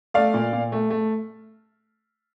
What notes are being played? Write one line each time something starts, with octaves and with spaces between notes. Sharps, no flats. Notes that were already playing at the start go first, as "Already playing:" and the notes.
A3 D5 F5
A#2
A#2
A3
A3